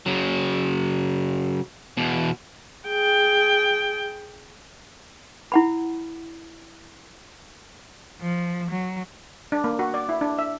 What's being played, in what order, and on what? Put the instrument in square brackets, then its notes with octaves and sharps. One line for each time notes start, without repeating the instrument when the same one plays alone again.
[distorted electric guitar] C#3 F#3
E2 B2
[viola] G#4 G5
[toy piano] E4 F#5 B5
[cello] F3
F#3
[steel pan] D4
A#3
F#4
D5
E4
D4
E5